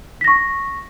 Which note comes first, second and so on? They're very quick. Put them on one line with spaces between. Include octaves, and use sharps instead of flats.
B6 A#6 C#6